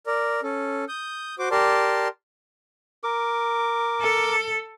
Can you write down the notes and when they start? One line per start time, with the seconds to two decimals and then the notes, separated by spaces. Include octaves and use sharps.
0.07 A#4 D5
0.43 C#4 A4
0.88 D#6 G6
1.39 F#4 C5 D6
1.51 G4 A#4 D5 A5 C6
3.04 A#4 D6
4.02 A4